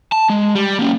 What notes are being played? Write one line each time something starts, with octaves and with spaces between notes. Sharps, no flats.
A5
G#3
G3
A#3 C#4